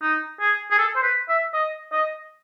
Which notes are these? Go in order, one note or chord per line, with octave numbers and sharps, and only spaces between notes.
D#4
G#4
G#4
A4
C5
B4
E5
D#5
D#5